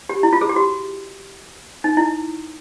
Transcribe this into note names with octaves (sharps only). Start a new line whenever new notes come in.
G4
E4
F4
G#4
G4
F#4
D#4
E4